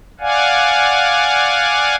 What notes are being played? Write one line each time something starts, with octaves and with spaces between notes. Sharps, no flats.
D5 F5 F#5 G#5